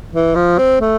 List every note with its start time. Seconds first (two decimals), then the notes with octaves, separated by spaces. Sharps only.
0.13 E3
0.35 F3
0.58 C4
0.80 A3